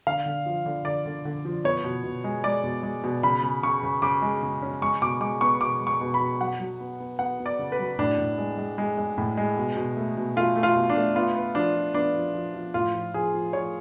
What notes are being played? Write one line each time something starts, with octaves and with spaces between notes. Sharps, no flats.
D3 F5
D3
F3
D3
D3 D5
D3
D3
F3
B3 C#5
B2
B2
G#3
G#3 D5
B2
G#3
B2
C#3 B5
C#3
C#3 C#6
C#3
C#3 D6
G#3
C#3
C#4
G#3 C#6
B2 D6
G#3 D6
B3 C#6
B2 D6
G#3
C#6
B2
B5
B2
F#3 F#5
F#3
B3
B3
B3 F#5
B3
D5
C#3
B4
F#3
A2 D4
A2
G#3
G#3
G#3
G#3
A2
G#3
B2
B2
A3
B2
A3 F4
A3
F4
B2
D4
A3
B3 F4
B3
F3 D4
F3
B3 D4
F3
F3
F3
A2 F4
F3
F3 G#4
F3
F3 C#5